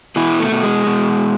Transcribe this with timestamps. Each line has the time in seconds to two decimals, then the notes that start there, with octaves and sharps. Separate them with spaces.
0.16 B2 E3 E4
0.40 A3
0.52 B2
0.63 G#3
0.87 B2